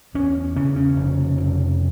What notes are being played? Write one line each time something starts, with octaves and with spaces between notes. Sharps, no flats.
E2 C#4
C#3 C#4
C#4
F1
F1